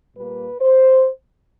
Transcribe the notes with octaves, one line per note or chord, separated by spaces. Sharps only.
A#2 G3 A#3 B4
C5